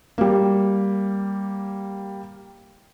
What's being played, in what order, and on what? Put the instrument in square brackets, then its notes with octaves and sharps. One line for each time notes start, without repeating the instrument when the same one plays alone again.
[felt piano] G3 A#3